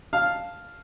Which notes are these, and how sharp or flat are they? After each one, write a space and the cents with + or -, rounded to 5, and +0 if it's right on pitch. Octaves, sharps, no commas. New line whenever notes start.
F5 +0 A5 -5